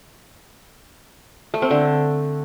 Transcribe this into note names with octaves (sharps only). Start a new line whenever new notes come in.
A3
C4
D3